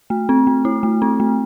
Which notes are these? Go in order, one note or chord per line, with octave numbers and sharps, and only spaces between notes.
A3
C4
A3
E4
A3
C4
A3